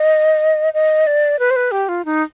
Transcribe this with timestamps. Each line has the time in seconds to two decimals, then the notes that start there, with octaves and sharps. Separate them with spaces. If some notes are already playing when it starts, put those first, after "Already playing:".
Already playing: D#5
0.74 D#5
1.07 D5
1.39 B4
1.51 C5
1.56 B4
1.71 G4
1.89 F4
2.05 D#4